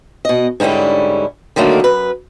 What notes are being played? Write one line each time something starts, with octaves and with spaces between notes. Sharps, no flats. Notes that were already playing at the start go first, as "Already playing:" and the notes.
B2 D#5
G#2 D3 G3 C#4 E4
D3 D#3 F#3 A3 A#3
F#2 B4